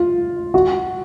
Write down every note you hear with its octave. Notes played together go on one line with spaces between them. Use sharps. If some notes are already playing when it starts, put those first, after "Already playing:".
Already playing: F4
F#4